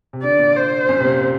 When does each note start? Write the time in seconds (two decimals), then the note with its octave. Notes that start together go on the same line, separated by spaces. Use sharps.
0.13 C3
0.23 D3 D5
0.39 A#2
0.55 C5
0.89 F#2
1.00 C3
1.05 A#2